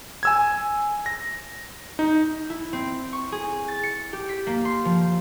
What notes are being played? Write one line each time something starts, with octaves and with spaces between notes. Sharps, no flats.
G#5 E6 G#6
A#6
D#4
E4
C4
C#6
G#4
A6
C#7
G4
B6
A#3
C6
F3